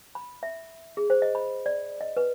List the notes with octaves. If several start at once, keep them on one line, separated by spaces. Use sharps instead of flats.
B5
E5
G#4
C5
D#5
B5
D5
D#5
B4